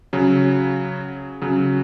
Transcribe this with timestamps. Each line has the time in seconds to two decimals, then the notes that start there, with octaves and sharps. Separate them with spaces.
0.13 C#3 F#3
1.42 C#3 F#3